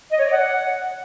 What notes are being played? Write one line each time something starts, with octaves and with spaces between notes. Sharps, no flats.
D#5
C#5
D5
F#5